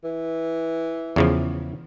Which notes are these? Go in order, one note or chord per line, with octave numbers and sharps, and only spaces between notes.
E3
E2 C#3 F3